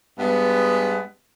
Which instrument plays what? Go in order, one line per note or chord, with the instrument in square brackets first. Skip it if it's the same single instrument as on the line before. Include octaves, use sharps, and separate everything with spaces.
[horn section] G2 G#3 B3